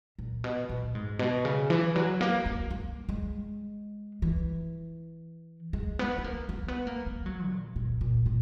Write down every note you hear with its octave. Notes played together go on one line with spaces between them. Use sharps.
A#2
B2
A#2
G#2
B2
C#3
E3
F#3
A#3
A#3
A#3
G#3
E3
G#3
B3
B3
A#3
A#3
B3
A#3
A#3
F#3
A#2
A#2
A#2
A#2